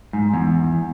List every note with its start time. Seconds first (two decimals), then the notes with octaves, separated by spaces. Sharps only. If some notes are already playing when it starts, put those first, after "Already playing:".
0.13 G#2
0.34 E2